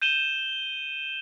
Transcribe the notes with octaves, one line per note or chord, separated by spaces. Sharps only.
G6 D#7 E7 G7